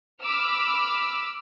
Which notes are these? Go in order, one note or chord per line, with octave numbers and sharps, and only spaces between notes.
B5 D6 E6 F6